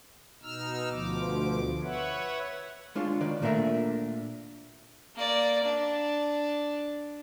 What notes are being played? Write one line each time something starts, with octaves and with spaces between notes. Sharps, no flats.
B2 D#4 E6 F6
D2 B2 F3 D6
B4 C#5 E5 F#5
G#3 D4 F4 C#5
D#3 B4 D5
A#2 A3 D4 A#4 E5
A#3 D5
D4